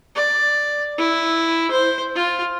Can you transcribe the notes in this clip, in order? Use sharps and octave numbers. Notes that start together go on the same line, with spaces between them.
D5
E4
C5
F4